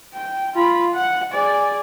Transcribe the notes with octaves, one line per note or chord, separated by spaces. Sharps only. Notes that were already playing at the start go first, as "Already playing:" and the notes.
G5
F4 B5
F#5
G#4 D5